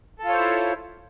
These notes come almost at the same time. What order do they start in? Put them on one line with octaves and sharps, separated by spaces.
A4 F4 C#5 C5 E4